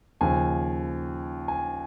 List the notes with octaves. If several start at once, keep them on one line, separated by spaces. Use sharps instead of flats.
D#2 C#3 F3 G#5
G#5